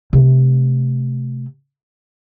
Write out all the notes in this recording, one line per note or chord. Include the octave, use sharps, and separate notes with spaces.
C3 A3